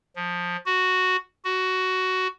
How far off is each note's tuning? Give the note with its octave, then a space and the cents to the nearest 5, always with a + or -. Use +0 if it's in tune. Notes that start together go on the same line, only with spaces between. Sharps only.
F3 +15
F#4 +0
F#4 +10